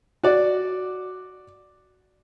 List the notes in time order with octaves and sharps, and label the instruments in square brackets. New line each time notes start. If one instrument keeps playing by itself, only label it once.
[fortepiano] F#4 D5